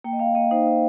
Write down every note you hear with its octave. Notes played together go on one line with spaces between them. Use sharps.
A#3 G5
D#5
A#3 F5
A#3 D#5
D#4 C5
D#4 C5